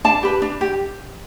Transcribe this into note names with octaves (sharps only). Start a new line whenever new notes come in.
D4 A5
G4 B4
D4
G4